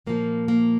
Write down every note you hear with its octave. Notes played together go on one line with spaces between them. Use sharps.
A#2 F3 A#3
A#3